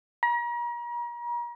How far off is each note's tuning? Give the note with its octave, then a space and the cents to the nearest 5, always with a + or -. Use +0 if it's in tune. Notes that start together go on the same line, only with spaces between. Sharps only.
A#5 +40